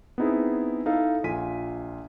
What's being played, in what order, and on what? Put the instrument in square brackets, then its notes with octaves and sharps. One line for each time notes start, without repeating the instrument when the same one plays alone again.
[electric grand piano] B3 C4 D#4 E4 G#4
D#4 E4 A4 F5
A#1 F4 G#5 B6 D#7